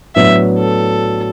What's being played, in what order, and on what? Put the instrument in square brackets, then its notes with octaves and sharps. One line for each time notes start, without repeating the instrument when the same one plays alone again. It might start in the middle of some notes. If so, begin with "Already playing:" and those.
[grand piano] A2 F#3 B3 D4 B4 [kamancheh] E5
[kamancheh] A4